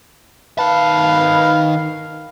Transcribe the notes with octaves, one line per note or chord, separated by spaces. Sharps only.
D#3 B4 F5 A5